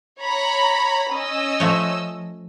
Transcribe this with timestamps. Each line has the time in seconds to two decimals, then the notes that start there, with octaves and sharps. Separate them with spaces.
0.20 C#5 A#5 B5
1.11 C#4 D#5 E6
1.60 F3 A3 C#5